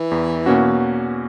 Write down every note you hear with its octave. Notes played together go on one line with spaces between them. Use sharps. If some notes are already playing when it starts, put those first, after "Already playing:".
Already playing: E3
E2
B2 A#3 C#4 F#4